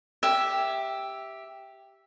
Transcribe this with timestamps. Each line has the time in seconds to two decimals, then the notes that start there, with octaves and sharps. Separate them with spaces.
0.23 G4 E5